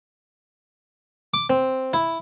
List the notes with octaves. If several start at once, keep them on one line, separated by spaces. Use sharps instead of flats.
D6
C4
E4